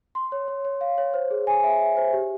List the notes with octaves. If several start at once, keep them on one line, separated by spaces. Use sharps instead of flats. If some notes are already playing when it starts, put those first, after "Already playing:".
C6
C#5
C#5
C#5
F5
C#5
C5
G#4
G#5
E5
E5
C5
G4